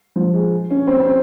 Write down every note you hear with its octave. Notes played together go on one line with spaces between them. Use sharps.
F3
G#3
C#4
C4
C4